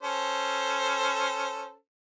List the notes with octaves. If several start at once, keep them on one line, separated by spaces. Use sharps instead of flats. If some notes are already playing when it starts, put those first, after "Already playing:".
C#4 A4 C5